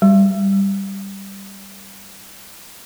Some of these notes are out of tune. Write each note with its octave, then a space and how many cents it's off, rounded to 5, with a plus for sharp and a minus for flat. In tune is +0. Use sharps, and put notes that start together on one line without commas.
G3 +0